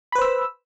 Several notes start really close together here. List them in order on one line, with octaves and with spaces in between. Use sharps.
B5 B4 C5 E6